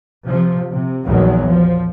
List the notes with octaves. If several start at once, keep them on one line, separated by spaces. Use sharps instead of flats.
C3 F3
C3
A#1 E2 D#3 F3 F#3
F3